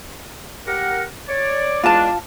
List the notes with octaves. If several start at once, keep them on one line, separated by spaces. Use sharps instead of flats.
G4 A#4 F#5
C#5 D5
E2 G#3 D4 F4 A5